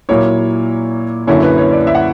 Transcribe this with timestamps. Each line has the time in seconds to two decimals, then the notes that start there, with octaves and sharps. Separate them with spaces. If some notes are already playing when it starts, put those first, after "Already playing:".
0.09 A#2 F#3 A#3 E4 C#5
1.27 F#2 D3 A#3 C#4 E4 C#5
1.42 B4
1.58 C#5
1.72 D5
1.87 E5
1.95 F#5